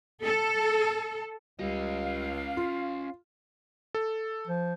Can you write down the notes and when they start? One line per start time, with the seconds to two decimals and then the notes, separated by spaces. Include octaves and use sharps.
0.23 A4
1.59 C#2 G3 C#4 D#5 F5
2.57 F4
3.95 A4
4.47 F3